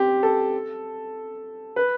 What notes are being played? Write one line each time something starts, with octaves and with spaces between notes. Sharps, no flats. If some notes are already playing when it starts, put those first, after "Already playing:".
Already playing: C4 G4
A4
B4